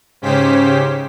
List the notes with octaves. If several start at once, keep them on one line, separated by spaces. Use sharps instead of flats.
G#2 C#3 C#4 G4 C5 B6